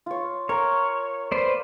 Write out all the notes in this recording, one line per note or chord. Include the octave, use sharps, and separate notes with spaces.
F4 C#5
A#4 C#5
B4 C5 D5